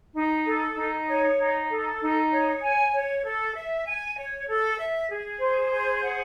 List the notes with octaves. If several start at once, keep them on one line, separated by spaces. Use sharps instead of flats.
D#4
A4
D#4
C#5
D#4
A4
D#4
C#5
G#5
C#5
A4
E5
G#5
C#5
A4
E5
G#4
C5
G#4
F#5